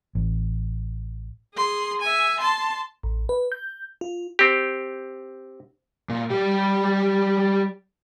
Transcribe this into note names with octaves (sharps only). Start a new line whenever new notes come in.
A1
G#4 C6
E5 G#5
A5 C6
A1
B4
G6
F4
C4 G4
A#2
G3 G4